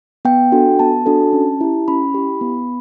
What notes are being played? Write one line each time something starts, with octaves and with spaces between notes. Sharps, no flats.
B3 G5
D4 F#4 A4
B3 A5
D4 F#4 A4
C#4
E4 G4
C#4 B5
E4 G4
B3